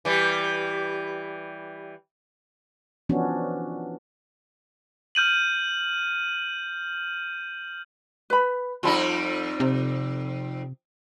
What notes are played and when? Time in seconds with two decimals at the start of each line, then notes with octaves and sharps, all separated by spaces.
0.05 E3 G3
3.09 E3 F3 B3 C#4 D4 F#4
5.15 F6 G6 D#7 F#7
8.30 B4 B5
8.83 F2 G3 D#4 F4 A5 B5
9.60 C3